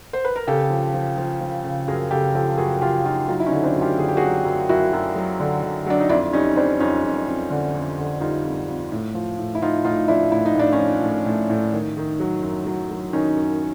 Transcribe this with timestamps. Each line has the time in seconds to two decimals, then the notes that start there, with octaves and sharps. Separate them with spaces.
0.13 C5
0.25 B4
0.36 A#4
0.47 C#3 G4 A4
0.70 F3
0.94 F3
1.17 F3
1.41 F3
1.64 C#3
1.88 F#2 G#4 A#4
2.11 C#3 G4 A4
2.30 A#4
2.35 F3 G4 A4
2.58 F#2 F#4 G#4
2.81 C#3 F4 G4
3.05 C#3 D#4 F4
3.28 F#3 D#4 F4
3.40 E4
3.46 C#4 D#4
3.52 D3
3.64 C4 D4
3.76 F#2
3.81 F4 G4
3.98 D3 G#4
4.08 G4
4.17 F#4 G#4
4.22 F#3
4.45 F#2
4.69 F#2 E4 F#4
4.93 F#2
5.16 F#3
5.40 D3
5.63 D3
5.86 F#3 D4
6.00 D#4
6.09 F2 D4 E4
6.33 G3 C#4 D#4
6.56 G3 C4 D4
6.80 F2 C#4 D#4
7.04 F2
7.28 F2
7.50 D3
7.74 F2
7.98 D3
8.20 G3 D#4 F4
8.44 F2
8.68 F2
8.92 A2
9.14 F3
9.39 A2
9.55 E4
9.62 F3 D#4 F4
9.85 A2 D#4 F4
10.08 F3 D4 E4
10.32 A2 E4
10.45 D#4
10.55 A2 D4
10.73 C#4 D#4
10.79 F3
11.02 A2
11.26 A2
11.50 A2
11.72 D#3
11.97 D#3
12.20 F#3
12.43 F#2
12.66 F#3
12.90 F#3
13.13 D#3 C#4 D#4
13.37 F#2